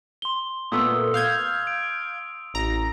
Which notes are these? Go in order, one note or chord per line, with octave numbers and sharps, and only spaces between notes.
C6 G7
A#2 A3 B3 D#6 E6
F5 G6 G#6 F7
D7
A1 A#5